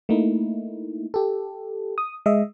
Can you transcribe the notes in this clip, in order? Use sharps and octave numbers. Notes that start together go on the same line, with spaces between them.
A3 A#3 D#4 E4
G4 A4
D#6
G#3 D#5 E5